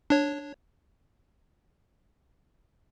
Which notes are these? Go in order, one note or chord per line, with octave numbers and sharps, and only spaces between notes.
D4 C#5